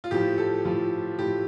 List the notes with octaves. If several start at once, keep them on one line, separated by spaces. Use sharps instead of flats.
F4
A2 F3 G4
A4
A2 F3 F4
A2 F3 G4